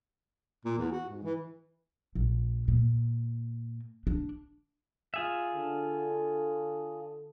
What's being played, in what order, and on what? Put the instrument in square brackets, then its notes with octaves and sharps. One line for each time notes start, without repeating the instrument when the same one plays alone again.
[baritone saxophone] A#2
E2
F#4
G#2
E3
[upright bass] A#1
A#2
D4
[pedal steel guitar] F4 G#4 E5
[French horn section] D3 A4